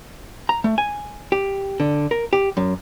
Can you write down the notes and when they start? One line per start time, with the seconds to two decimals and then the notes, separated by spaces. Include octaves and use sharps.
0.49 A#5
0.64 A3
0.78 G#5
1.32 G4
1.80 D3
2.11 A#4
2.33 G4
2.57 F#2